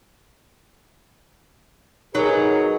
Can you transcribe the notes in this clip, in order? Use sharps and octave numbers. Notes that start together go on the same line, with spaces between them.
F#3 D#4 G#4 A#4 B4